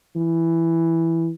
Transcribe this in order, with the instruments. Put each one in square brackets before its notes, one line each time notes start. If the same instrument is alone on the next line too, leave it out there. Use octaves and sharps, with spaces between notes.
[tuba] E3